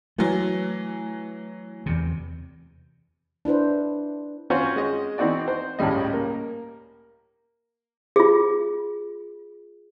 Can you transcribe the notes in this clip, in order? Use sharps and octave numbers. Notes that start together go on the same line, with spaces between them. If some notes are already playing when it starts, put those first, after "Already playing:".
E3 F#3 A3
E2 C3
D4 E4 B4 C5
C4 C#4 F4 F#4 C5 C#5
G#3 D#5
E3 B3 C4 D#4 F#4 D5
C5
C#2 A2 C#3 G3 D#5
A#3
F4 G#4